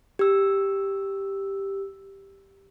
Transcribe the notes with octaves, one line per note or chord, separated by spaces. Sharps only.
G4 E6